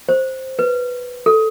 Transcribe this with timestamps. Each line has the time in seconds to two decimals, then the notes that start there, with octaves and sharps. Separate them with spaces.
0.09 C5
0.59 B4
1.26 A4